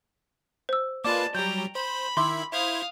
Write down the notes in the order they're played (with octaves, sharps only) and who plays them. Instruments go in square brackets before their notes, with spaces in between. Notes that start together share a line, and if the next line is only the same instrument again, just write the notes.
[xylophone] C5 E6
[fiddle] G#3 A5 [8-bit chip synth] A#3 F4 B4 [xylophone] D5 D6
[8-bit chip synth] F#3 G3 [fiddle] G5 A#5 [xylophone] G6
[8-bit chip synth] C5 [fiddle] B5
[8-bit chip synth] D#3 E4 E5 [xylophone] C6 D6
[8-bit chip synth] E4 C5 G#6 [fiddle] F5 D#6